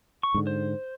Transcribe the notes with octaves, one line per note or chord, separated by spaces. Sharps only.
C#6
G#2 D3
C5